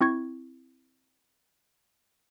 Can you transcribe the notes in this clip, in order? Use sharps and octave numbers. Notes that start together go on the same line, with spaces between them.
C4 E4 C#6 G#6